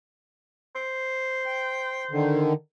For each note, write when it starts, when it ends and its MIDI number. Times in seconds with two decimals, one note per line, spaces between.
0.76 2.50 72
1.46 2.04 79
2.11 2.53 50
2.11 2.53 51